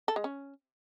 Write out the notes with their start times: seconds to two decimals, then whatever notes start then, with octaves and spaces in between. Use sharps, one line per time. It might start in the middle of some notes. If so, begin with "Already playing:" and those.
0.08 A4
0.16 G#3
0.24 C#4